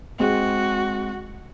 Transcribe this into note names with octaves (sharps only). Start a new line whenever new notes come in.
G#3 C4 F#4